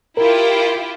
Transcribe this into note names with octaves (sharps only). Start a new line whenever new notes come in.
E4 F4 G4 A#4